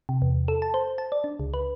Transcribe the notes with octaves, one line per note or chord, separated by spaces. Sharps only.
C3
E2
A4
A5
C5
A5
D5
D4
C#2
B4